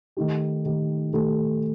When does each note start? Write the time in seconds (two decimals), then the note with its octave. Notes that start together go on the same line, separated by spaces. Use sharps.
0.17 D#3 A3 D#4 G4
0.65 D#3 A3 D#4 G4
1.13 D#3 A3 D#4 G4